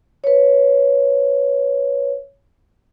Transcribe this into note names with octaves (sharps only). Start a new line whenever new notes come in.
B4 C#5